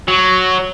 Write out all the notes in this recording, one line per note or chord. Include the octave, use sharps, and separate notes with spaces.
F#3